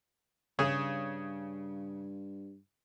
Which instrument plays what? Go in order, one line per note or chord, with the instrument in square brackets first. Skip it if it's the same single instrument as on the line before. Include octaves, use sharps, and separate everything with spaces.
[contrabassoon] G2 [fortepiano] C#3 G#4